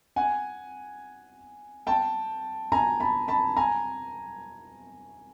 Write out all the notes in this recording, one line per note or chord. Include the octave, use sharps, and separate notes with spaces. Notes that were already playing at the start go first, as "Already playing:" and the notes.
F#5 G#5
G5 A5
G#5 A#5
A5 B5
A5 B5
G#5 A#5